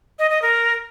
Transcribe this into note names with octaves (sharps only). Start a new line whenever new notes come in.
D#5
D#5
A#4